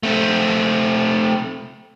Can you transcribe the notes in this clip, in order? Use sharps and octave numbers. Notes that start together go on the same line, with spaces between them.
A3 C4